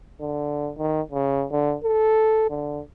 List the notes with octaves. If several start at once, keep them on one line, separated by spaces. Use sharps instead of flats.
D3
D#3
C#3
D3
A4
D3